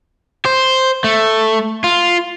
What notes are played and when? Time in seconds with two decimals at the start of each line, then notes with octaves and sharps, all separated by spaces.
0.45 C5
1.04 A3
1.84 F4